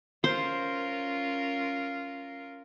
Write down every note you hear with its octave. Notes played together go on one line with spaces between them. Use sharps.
C#4 F4 A#4 C5